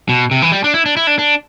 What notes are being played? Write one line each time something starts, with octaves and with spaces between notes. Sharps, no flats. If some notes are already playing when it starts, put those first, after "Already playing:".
B2
C3
E3
G3
D4
E4
D4
E4
D4
D4